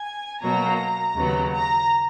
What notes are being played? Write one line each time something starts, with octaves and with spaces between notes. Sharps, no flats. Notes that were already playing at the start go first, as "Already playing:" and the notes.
Already playing: G#5
B2 F#3 A#3 A#5
D#2 C#3 F#3 B3
A#5